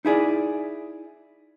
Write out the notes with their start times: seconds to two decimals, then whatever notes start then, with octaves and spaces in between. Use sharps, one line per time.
0.05 D#4 E4 G#4 D5